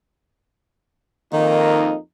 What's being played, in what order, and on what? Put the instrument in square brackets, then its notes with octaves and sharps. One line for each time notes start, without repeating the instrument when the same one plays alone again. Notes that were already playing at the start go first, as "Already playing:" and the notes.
[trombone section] F2 A#3 D#4 [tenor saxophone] D#3